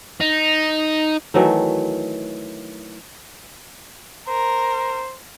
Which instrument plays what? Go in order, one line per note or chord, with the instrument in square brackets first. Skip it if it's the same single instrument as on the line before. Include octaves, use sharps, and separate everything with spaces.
[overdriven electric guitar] D#4
[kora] D#3 E3 F#3 A3
[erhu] A#4 [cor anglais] C5